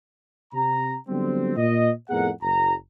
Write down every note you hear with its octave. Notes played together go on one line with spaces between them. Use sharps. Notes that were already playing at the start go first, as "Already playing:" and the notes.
C3 A#5
D3 F#3 G3 B3 C4
A#2 D#5
F2 A2 B3 G#4 A#4 F#5
F#1 A#5